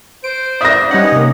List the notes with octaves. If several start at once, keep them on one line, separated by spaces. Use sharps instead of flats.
C5 D7
D5 E5 F5 D#6 A#6
G3 C#4 D#4 B4 F#5
C3 A#3